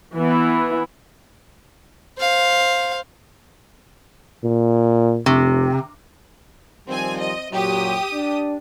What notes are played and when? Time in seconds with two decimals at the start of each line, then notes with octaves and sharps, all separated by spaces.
0.13 E3 B3 E4
2.18 C5 F5
4.44 A#2
5.26 F1 C3
6.87 D#3 F3 G3 C4 G#5
7.19 D#5
7.53 F#2 A#2 F#3 G4 D#6
8.13 D4